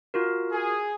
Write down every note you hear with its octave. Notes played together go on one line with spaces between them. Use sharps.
F4 F#4 A#4
G#4